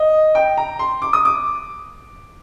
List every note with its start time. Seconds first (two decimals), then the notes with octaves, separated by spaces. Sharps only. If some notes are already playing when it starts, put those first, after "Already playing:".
Already playing: D#5
0.35 G5
0.58 A#5
0.79 C6
1.02 D6
1.13 D#6
1.25 D6